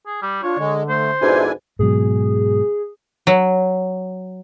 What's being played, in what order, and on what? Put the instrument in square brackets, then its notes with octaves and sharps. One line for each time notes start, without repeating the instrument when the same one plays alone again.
[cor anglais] G#4
G3
[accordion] D4 [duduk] F4 [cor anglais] C#5
[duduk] D3 [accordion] G#3
[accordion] A3 [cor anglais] C5
[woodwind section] F2 G#2 B2 [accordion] D4 E4 G#5
[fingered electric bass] G#2 B2 F#3 [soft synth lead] G#4
[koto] F#3